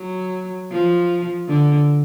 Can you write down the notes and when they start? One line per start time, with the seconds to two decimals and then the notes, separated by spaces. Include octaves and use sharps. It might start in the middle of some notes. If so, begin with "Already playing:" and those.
Already playing: F#3
0.71 F3
1.48 D3